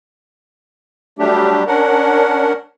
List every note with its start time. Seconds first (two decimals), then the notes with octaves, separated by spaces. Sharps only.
1.19 F#3 G3 A3 D4 G4
1.67 C#4 D4 A#4 F#5